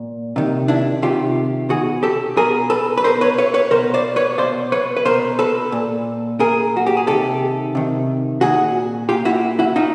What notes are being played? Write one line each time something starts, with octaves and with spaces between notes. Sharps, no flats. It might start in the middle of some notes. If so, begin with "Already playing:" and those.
Already playing: A#2
C3 D#3
D4 E4
C3 D#3 F4 G4
B2 F#4 G#4
G4 A4
B2 G#4 A#4
A4 B4
B4
B2 A#4 C5
B4 C#5
B4 C#5
B4 C#5
B2 A#4 C5
C5 D5
B4 C#5
B2 C5 D5
B4 C#5
B4
B2 A#4 C5
A4 B4
A#2
A#2 G#4 A#4
F#4
G4
G#4
C3 D#3 G4 A4
C3 D#3
A#2 F#4 G#4
A#2 F4 G4
E4 F#4
E4 F#4
A#2 D#4 F4